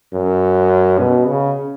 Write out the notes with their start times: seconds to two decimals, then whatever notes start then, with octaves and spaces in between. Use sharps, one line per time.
0.13 F#2
0.99 B2
1.27 C#3